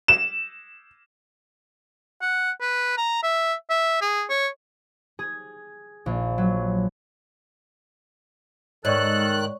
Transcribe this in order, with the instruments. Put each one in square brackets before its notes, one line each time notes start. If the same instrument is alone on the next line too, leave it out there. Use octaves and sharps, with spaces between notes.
[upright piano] E7
[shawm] F#5
B4
A#5
E5
E5
G#4
C#5
[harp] G#4
A#1
F#3
[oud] G#2 [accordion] D#3 F#6 [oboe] A4 [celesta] C#5 D5 C#6